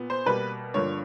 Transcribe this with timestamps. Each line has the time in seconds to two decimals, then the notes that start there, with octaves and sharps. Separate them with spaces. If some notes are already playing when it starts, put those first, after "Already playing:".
Already playing: A#2 B3
0.10 C5
0.26 B2 G3 A#3 B4
0.74 G2 D3 F3 A#3 C#5